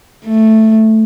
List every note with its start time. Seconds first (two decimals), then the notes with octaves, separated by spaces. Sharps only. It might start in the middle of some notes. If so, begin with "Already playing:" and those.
0.24 A3